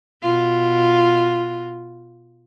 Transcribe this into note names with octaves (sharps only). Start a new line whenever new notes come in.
B2 F4